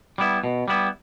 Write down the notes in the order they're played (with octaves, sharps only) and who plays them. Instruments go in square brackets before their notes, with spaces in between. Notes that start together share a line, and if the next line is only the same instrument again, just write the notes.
[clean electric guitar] G3 B3 E4
B2
G3 B3 E4